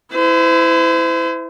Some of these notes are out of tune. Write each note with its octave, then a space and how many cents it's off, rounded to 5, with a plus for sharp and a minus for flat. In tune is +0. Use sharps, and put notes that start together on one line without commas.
E4 +0 C5 -40